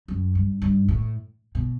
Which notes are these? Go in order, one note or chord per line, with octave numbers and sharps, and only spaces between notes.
F#2
G2
G2
A2
B2